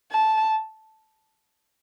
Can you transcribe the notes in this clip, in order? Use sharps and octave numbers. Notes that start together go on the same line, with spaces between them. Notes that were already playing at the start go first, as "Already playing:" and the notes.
A5